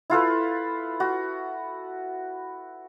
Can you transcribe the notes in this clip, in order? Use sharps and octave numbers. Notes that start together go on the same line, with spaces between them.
E4 F4 A4 B4
F#4